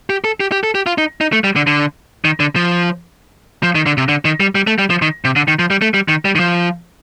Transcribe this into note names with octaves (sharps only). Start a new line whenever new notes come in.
G4
A4
G4
G4
A4
G4
F4
D#4
D#4
A3
G3
D3
D3
D#3
D3
F3
F3
D#3
D3
C3
D3
D#3
G3
G3
A3
G3
F3
D#3
C3
D3
D#3
F3
G3
A3
G3
D#3
G3
D#3
F3